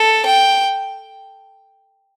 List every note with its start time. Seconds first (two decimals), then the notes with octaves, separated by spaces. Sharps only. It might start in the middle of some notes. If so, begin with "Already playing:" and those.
Already playing: A4
0.26 G5